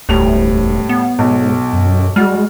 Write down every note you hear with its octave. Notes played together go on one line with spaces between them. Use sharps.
E1 D2 A2 G3 F7
B3
B1 G#2
F#2
G3 G#3 F#4 F6